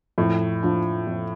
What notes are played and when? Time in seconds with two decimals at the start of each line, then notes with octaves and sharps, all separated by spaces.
0.18 F2 A2
0.63 F3 D4
1.07 F2